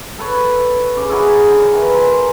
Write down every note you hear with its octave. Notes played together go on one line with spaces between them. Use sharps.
A4 B4 C#5
C#3 D6
E4 F#4 G#4 A#4
D3
D#3 E3
F4 A#4 G#5